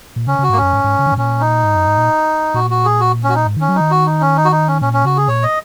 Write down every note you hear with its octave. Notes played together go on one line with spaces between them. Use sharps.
A#2
C#3 C#4
C#3 F#4
G#2 A#3
F#2 C#4
G#2
G#2
C#3
D#3
G#2
A#2 C#4
D#4
G#2
F#2
G#2
A#2
A#2 F#4
F#4
G#4
F#4
C#4
F#4
D#4
G#2
D#3 C#4
F#3
D#3 D#4
F#4
D#4
C#4
D#4
F#4
D#4
C#4
A#2 C#4
C#4
C#3 F#4
G#4
A#2 C#5
D#5